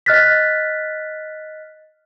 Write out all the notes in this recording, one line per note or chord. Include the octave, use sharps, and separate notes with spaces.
D#5 F6 F#6 A6 B6